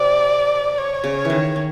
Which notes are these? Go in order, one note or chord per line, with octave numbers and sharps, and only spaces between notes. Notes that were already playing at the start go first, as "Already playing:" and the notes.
Already playing: C3 D5
C#5
C#3
D#3 E3
D#3